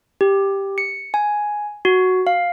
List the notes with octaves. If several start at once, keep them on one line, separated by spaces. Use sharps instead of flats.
G4
C#7
G#5
F#4
F5